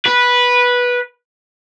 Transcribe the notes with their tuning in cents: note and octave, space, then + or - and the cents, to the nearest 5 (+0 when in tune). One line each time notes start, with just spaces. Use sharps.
B4 -10